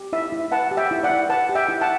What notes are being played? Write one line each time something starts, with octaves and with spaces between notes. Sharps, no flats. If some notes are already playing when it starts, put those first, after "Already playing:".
Already playing: G4
E4 E5
E4
B4 F#5 A5
G4
E5 G5
E4
D5 F#5
E4
B4 F#5 A5
G4
E5 G5
E4
F#5 A5